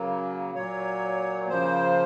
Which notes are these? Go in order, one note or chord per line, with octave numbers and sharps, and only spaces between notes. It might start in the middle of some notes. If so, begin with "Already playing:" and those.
Already playing: C#3 F#3 A#3
A#2 F#3 A#3 C#5
C#3 F3 A#3 C5